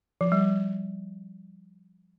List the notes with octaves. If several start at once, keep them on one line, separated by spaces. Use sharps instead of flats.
F3
G3